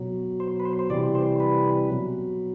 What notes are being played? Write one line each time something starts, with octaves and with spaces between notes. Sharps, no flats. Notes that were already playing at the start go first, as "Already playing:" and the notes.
Already playing: B2 F#3
C5
B4
C5
C5
C3 E3 G3 D5
C5
B4
B2 F#3